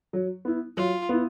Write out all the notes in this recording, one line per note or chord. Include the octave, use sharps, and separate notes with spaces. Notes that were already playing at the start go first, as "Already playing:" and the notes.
F#3
B3 E4
F#3 F4
B3 E4